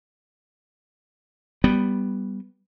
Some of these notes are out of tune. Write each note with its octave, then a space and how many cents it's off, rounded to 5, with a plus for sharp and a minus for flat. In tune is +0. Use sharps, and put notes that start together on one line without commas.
G3 +0 B3 +0